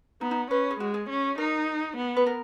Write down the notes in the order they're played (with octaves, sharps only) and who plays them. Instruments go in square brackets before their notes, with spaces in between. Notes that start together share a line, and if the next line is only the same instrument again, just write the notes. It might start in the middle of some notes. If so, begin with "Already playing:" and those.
[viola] B3 [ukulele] D#4
[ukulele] D#4
[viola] C#4 [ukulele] B4
[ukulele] G#4
[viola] G#3 [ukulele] F#4
[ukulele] G#4
[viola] C#4
[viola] D#4 [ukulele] A#4
[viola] B3
[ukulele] B4
A#4